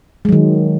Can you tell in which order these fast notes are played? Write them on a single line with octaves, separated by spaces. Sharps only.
G#3 F#3 D#3